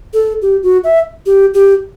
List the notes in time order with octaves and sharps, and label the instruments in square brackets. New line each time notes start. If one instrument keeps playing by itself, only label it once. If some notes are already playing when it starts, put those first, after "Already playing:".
[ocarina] A4
G4
F#4
E5
G4
G4